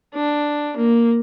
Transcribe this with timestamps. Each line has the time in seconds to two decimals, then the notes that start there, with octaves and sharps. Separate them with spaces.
0.15 D4
0.77 A#3